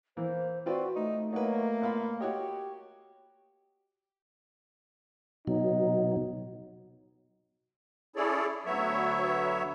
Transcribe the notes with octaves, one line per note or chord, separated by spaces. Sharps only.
E3 A#3 C5
C4 F4 F#4 B4 D5
A3 D#4
F#3 A#3 D#4 B4
A#2 B3 F5 B5
F#4 G4 C#5 D#5
B2 F#3 D#4
C#4 E4 G#4 A4 C#5 D5
D2 F#3 B3 C#5 E5